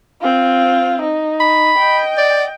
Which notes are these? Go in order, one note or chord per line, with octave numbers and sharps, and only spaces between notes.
C4 F4
D#4
B5
D#5 G5
D5